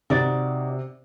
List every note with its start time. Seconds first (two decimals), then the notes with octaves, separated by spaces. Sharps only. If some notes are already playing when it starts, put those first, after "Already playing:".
0.10 C3 D#4 F#4 D5